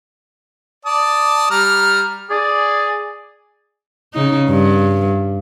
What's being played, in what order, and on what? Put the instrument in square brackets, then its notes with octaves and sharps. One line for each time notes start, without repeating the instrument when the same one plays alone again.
[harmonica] D5 A5 D#6
G3 A#5 F6
[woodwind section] G#4 D5
[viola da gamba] C#3 D#4
G2